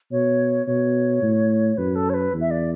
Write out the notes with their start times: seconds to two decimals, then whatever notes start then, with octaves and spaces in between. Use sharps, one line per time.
0.12 B2 C#5
0.67 B2 C#5
1.22 A2
1.78 F#2 B4
1.95 A4
2.10 C#5
2.14 B4
2.33 E2
2.41 E5
2.51 D5